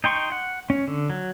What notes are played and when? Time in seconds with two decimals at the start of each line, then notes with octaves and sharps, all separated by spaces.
0.04 D#4 G5 C6 C#6
0.32 F#5
0.70 C#4
0.88 D3
1.10 F#3